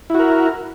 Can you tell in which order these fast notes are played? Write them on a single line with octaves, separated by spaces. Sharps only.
E4 F#4 A#4